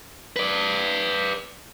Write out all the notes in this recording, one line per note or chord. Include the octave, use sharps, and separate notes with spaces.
B4 D5